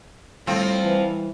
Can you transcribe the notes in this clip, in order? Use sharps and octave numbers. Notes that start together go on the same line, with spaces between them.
A2 F3 G3 C4
E3